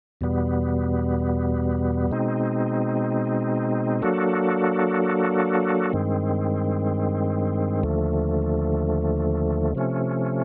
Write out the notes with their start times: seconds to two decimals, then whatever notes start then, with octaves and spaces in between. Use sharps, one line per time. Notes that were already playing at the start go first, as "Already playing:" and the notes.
0.21 E2 B2 G3 B3
2.11 B2 G#3 C4 D#4
4.02 F#3 A#3 D4 F#4 A4
5.93 G2 D#3 G#3 C4
7.83 D#2 D3 F3 A3
9.75 C3 F3 A3 C#4